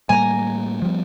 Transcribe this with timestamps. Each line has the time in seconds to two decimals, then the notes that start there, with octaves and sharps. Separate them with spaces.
0.09 A2 G3 A#3 G#5 A#5
0.82 F3 G3 B3